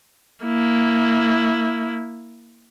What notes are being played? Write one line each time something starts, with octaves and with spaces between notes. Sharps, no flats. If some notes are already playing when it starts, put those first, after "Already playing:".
A#3 E4